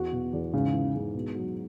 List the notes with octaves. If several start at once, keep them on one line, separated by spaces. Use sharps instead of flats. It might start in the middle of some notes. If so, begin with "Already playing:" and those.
Already playing: E2 F#4
B2
E2
G#2 C#3
E3
G#2
B2
F#3